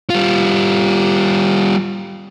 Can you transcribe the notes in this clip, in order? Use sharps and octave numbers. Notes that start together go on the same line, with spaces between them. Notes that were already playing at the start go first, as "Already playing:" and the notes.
G3 F4